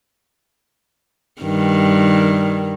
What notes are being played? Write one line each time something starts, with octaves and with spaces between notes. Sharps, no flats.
G2 D#3